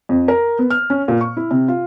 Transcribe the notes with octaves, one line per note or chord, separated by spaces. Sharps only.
F2
A#4
B3
F6
C#4
A#2
C#6
E4
C3
F4